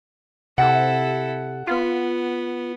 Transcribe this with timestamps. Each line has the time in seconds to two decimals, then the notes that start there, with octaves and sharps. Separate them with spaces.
0.58 C3 E4 A4 F#5
1.67 B3 F4